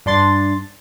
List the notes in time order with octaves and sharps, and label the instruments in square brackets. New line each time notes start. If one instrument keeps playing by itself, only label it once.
[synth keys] G2 D4 C6 A6